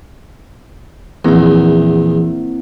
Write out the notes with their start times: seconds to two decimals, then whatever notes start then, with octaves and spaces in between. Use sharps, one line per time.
1.25 A#1 E2 A#3 C4 E4